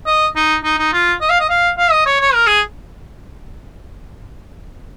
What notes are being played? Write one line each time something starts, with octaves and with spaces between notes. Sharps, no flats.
D#5
D#4
D#4
D#4
F4
D#5
F5
D#5
F5
F5
D#5
C#5
C#5
A#4
G#4